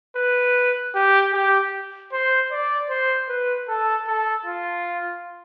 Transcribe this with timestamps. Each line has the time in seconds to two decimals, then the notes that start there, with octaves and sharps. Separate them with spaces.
0.16 B4
0.95 G4
1.34 G4
2.12 C5
2.52 D5
2.89 C5
3.29 B4
3.68 A4
4.07 A4
4.46 F4